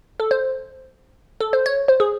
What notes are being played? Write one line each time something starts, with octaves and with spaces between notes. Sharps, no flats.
A4
C5
A4
C5
C#5
C5
G#4